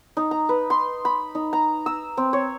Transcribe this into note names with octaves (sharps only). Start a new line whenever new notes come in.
D#4
A#5
B4
C6
B5
D#4
A#5
E6
C4
C#5